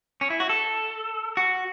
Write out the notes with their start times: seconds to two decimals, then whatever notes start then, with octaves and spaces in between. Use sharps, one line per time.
0.21 C#4
0.30 E4
0.40 F#4
0.49 A4
1.37 F#4